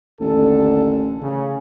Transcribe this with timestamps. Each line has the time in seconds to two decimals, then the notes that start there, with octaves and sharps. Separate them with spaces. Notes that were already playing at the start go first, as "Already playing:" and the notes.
0.20 A1 D#2 D3 A4
1.21 C#3